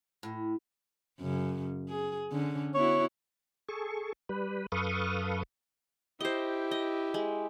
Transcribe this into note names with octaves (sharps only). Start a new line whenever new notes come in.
A2
F#2 C#3
G#4
D3 C#4
B3 E4 F#4 C#5
G#4 A4 C#6
G3 B4
F#2 A4 B4 F5 C#6 D#6
E4 G4 C5 D#5
D#5
G#3